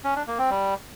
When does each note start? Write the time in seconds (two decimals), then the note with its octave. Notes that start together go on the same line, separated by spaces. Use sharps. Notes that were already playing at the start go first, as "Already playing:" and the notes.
0.04 C#4
0.16 D4
0.27 A#3
0.39 C4
0.50 G3